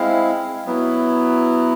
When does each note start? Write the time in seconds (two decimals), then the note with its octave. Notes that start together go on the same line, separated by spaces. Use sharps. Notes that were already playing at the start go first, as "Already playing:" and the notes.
Already playing: G#3 C4 E4 F5
0.66 F#3 B3 E4